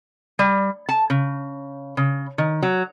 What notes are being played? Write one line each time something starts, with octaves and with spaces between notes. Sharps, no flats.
G3
A5
C#3
C#3
D#3
F#3